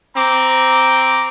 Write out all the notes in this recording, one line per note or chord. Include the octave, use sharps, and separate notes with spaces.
C4 A#5 D6